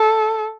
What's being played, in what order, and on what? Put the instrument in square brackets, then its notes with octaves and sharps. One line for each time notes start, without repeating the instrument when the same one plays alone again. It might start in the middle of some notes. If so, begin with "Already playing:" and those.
Already playing: [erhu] A4